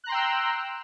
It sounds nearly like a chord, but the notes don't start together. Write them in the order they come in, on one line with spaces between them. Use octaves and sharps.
F#6 A#5 C6 G5 E6